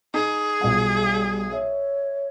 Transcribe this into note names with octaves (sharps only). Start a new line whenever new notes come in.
D#4 G#4
B1 G3 F4 F#5
C#5 E5